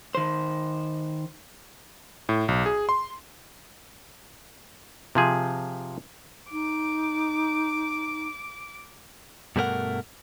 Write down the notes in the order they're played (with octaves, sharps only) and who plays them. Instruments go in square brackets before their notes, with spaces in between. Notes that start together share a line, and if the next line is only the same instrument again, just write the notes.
[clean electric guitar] D#3 C5
[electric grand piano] A2
B1
G#4
C6
[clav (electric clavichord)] C3 F3 G#4
[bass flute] D#4 [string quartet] D6
[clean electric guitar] G2 B2 A3 D#4 A#4 F#5